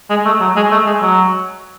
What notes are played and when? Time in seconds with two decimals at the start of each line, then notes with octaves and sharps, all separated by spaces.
0.10 G#3
0.25 A3
0.40 F#3
0.56 G#3
0.71 A3
0.86 G#3
1.02 F#3